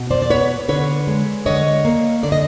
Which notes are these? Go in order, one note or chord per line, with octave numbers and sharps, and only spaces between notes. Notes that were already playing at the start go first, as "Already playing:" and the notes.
Already playing: B2
C5 D5
D5
B3 B4 C#5
D3 B4 C#5
G#3
D3 C#5 D#5
A#3
D3 D5
D#5